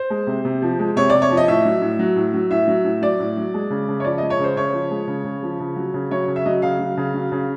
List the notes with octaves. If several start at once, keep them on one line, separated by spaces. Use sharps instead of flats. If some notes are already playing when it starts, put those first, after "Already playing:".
Already playing: C5
G#3
C3
C3
F3
G#3
C3 C#5
C3 D5
C#5
F3
D#5
A2 E5
F#3
A2
F#3
A2
F#3
A2 E5
F#3
A2
F#3 D5
A2
F#3
G#3
C#3
C#3
C#5
F3 D5
G#3 D#5
C#5
C#3 C5
C#3 C#5
F3
G#3
C#3
C#3
F3
C#3
F#3
C#3
F#3 C#5
C#3
E5
F#3 D#5
C#3 F5
F#3
C#3
F#3
C#3